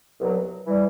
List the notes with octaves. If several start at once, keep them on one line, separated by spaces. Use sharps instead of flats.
C2 B2 F#3
E3 G3